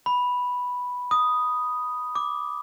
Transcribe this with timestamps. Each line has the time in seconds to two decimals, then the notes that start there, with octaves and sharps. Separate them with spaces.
0.06 B5
1.11 D#6
2.15 D6